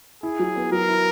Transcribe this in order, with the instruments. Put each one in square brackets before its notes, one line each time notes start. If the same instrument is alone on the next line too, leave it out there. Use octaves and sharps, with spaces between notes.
[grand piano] E4 [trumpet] G#4
[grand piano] F#3
B3
[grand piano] F#3 [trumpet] A#4
[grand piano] E4